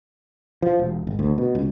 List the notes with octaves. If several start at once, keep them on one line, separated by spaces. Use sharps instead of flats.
F3
E1
G#1
D2
B2
C#2